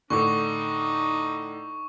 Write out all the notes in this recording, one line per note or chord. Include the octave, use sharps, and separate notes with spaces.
A2 D3 D4 D#4 C#6 D6